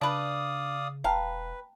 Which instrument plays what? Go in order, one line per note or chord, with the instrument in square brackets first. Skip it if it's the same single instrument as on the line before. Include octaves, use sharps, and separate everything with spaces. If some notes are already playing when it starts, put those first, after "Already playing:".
[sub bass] C#3 [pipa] D4 B4 [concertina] D5 F5 D#6
[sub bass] E1 [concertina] B4 [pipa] F5 [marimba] G5 A5 A#5